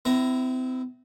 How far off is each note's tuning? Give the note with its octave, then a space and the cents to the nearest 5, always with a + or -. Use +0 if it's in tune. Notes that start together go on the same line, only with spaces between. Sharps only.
C4 -35 E4 +0 A#5 +0